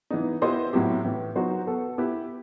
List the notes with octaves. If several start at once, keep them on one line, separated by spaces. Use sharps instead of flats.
E3 B3 D#4
B3 E4 G4 C5 D#5
A2 F#3 C4 E4 G4
A2 E3 B3
F#3 B3 D#4 F#4 C5
B3 F#4 A4
B3 E4 G4 B4